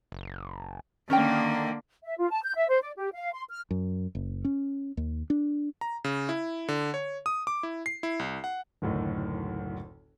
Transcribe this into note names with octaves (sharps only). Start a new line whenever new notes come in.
F#1
D3 D#3 A#3 C#4 C#5 G5
E5
F4
A5
G6
E5
C5
D5
G4
F5
C6
F6
F#2
F#1
C#4
D#2
D4
A#5
C#3
E4
D3
C#5
D#6
D6
E4
C7
E4
C2
F#5
F#1 D2 A2 D#3